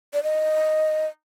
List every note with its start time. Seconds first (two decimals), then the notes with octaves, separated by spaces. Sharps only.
0.14 D5
0.23 D#5